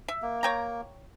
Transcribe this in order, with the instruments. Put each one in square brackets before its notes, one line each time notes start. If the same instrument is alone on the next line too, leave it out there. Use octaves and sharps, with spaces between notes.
[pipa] E5
[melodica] A#3
[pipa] C#5 G5 A#5